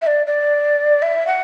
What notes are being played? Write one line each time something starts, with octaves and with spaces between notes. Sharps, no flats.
E5
D5
D5
E5
F#5